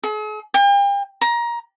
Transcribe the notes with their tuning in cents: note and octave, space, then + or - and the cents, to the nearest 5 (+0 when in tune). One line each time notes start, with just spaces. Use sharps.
G#4 +45
G5 +40
A#5 +20